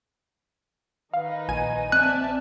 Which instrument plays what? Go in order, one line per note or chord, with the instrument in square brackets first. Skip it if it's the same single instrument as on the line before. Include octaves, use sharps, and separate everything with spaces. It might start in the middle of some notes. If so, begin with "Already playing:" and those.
[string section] D#3 D#4 B4 [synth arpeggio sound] F5
[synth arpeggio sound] A#1 G#5 D#7
[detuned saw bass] C4 [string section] D5 E5 A5 [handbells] F#6